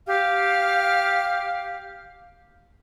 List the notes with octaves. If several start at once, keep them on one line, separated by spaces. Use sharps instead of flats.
G4 F5 F6